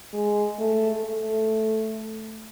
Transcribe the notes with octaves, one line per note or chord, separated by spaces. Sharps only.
G#3
A3
A3